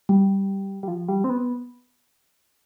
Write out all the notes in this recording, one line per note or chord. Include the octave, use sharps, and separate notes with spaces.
G3
G3
F3
G3
C4
B3